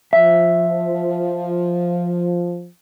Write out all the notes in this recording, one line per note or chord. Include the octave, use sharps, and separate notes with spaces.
F3 E5